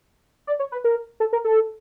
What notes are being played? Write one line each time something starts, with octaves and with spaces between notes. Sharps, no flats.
D5
C#5
B4
A#4
A4
A#4
A4